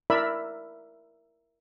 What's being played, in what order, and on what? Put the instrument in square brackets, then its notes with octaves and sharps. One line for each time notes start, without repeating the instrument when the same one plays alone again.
[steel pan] E4 A#4 D5 E5 B5